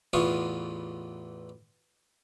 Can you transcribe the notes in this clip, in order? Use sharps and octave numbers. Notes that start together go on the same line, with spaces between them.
A1 E2 B3 F4 C#6 D#6